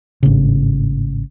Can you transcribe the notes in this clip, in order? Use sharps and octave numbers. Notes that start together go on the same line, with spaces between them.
G#1 A2 C#3